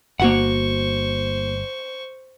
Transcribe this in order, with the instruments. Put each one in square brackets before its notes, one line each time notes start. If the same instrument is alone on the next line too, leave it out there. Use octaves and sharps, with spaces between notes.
[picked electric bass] G1 [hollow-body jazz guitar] A#3 F#4 F#5 [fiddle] C5 C#6